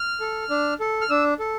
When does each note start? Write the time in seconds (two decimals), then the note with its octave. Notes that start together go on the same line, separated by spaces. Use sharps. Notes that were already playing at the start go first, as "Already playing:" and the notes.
Already playing: F6
0.20 A4
0.50 D4
0.80 A4
1.01 F6
1.10 D4 E6
1.39 A4